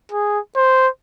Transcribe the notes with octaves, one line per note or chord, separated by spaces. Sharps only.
G#4
C5